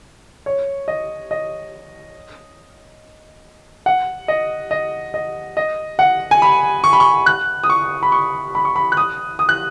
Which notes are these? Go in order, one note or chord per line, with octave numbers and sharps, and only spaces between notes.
C#5
D#5
D#5
F#5
D#5
D#5
D#5
D#5
F#5
G#5
B5
C#6
B5
C#6
F#6
D#6
C#6
B5
C#6
B5
C#6
B5
F#6
D#6
D#6
F#6